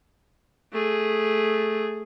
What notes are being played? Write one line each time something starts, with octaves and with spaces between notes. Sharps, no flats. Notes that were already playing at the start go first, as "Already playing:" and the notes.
A3 G#4